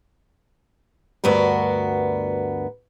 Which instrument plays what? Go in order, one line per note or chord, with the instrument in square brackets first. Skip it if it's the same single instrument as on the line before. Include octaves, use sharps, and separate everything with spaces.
[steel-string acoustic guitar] D2 G2 B3 F#4 A#4